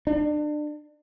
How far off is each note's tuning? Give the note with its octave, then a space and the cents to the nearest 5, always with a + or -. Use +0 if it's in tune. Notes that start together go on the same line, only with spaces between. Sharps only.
D4 +30